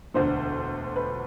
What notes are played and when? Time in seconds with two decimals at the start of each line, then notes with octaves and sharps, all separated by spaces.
0.14 E1 D2 D3 C5
0.96 B4